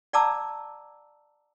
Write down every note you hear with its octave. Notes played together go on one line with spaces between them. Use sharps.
D5 F#5 A5 A#5 D6 E6